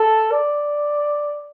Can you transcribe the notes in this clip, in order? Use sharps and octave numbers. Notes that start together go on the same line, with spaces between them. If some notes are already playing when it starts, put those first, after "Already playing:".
Already playing: A4
D5